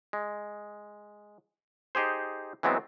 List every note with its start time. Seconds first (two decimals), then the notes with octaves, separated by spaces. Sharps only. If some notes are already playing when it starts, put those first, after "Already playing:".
0.13 G#3
1.95 D#4 G4 G#4 C5
2.63 E3 F#3 G#3 B3 C4